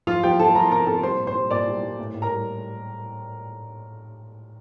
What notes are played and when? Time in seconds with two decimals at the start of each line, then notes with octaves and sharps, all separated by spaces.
0.07 F3 F4 F5
0.23 F3 G4 G5
0.39 F3 A4 A5
0.55 F3 A#4 A#5
0.71 C3 A#4 A#5
0.87 C3 A4 A5
1.03 G3 C5 C6
1.19 A#2
1.27 C5 C6
1.35 G3
1.51 A#2 D5 D6
1.67 G3
1.83 G3
1.99 A2
2.14 A2
2.22 A#4 A#5
2.30 G3